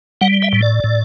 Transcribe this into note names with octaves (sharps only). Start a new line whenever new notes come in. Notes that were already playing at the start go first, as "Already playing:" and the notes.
G3 F#5
E5
A2
D5
A2